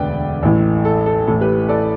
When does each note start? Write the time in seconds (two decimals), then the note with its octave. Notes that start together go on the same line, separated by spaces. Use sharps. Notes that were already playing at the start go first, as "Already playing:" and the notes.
Already playing: E1 D2 D3 B4 D5 G5
0.43 A1 A2 E3
0.85 A4
1.06 A4
1.27 A1 A2 E3 A4
1.41 G4 B4
1.69 A4 D5